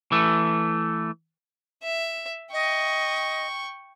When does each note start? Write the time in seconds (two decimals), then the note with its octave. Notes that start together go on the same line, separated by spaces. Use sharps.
0.12 E3 A3
1.83 E5
2.53 D#5 G5 C#6